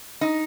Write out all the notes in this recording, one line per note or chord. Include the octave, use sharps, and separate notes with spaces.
D#4